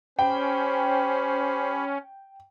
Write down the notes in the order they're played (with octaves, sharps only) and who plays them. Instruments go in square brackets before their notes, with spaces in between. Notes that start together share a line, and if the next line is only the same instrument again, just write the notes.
[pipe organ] C#4 [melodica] G4 B5 [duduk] C5 [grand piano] G5